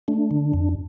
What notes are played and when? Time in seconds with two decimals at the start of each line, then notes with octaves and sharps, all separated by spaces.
0.08 A3 D4
0.31 D3
0.53 F2